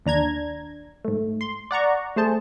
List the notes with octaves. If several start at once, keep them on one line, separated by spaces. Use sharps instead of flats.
D#2 D4 A#5 G#6
G#2 A3
C6
D5 F#5 A#5 C#6
A3 G#4 C5 A5